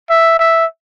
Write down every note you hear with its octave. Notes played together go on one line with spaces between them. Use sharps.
E5
E5